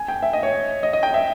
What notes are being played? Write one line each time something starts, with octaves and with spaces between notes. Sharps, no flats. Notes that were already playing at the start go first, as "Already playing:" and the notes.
Already playing: G#5
G5
E5
D#5
C#5
D#5
D#5
G5
E5